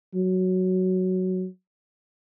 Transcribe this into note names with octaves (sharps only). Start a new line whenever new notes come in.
F#3